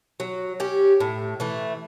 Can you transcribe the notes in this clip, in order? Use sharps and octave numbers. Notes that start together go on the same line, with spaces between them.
F#3
C#4 G4
A2
E3 A3